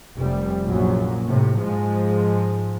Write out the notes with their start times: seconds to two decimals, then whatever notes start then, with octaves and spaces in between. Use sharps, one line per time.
0.17 F1 G3
0.65 A#1 F#2 A#2 F#3
1.27 A2 C3
1.58 G#2 F3 G#3